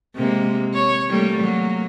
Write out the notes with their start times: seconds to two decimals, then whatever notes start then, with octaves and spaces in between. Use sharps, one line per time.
0.16 C3 G#3 A#3
0.74 C#5
1.10 G3 A3 A#3
1.40 F#3 A#3